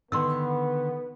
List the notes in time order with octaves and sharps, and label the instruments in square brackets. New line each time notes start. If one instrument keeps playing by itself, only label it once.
[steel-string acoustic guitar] D3 D#3 [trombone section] B3 [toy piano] C6 E6